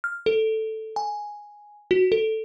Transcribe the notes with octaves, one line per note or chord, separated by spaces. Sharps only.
F6
A4
G#5
F#4
A4